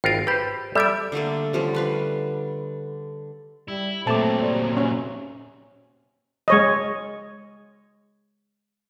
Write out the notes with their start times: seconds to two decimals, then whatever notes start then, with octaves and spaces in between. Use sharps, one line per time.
0.04 G#1 F4 A#4 G5 A6
0.27 G4 B4 C5 B5
0.75 G3 A4 D5 E5 A6 D7
1.12 D3 G3 A3 A#3
1.53 D3 F3 G3 C#4
1.74 G3 B4 F5
3.68 G3 E4
4.07 A#2 F#3 A3 C4 A5 D6
4.41 G3
4.77 B1 C3 C#4
6.48 G#3 C#5 D#5